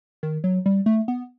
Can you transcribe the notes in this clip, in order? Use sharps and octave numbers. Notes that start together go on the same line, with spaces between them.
D#3
F#3
G3
A3
B3